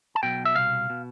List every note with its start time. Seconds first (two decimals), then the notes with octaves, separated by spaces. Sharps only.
0.15 A5
0.23 B1 B2 G5
0.45 E5
0.55 C2 B2 F5
0.90 B2